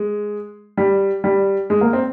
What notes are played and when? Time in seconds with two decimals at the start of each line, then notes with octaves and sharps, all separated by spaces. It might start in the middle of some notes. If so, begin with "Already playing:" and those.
Already playing: G#3
0.77 G3
1.24 G3
1.70 G#3
1.81 A#3
1.93 C4